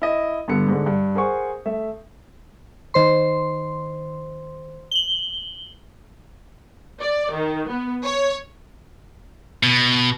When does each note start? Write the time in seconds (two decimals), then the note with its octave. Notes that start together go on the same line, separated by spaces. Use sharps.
0.02 E4 D#5
0.48 G2 D3 B3 C#7
0.68 G#2 D3
0.86 G2
1.15 G#4 A#4 C5 F#5 C#6
1.66 A3 E5
2.94 D#3 C5 C6
4.91 F#7 G7
7.01 D5
7.32 D#3
7.67 B3
8.04 C#5
9.63 B2